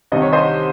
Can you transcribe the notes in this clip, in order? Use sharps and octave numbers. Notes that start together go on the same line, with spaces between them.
C2 C3 D#3 D#5
C#5
C5 D#5